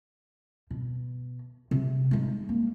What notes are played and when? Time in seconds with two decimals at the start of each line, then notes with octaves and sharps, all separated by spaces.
0.70 B2
1.71 C3
2.11 G#3 D#4
2.49 A#3